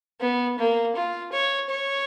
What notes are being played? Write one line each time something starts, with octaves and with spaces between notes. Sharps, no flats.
B3
A#3
F4
C#5
C#5